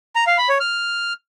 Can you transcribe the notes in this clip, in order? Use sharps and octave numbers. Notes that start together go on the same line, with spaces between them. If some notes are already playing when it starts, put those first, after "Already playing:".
A#5
F5
B5
C#5
F6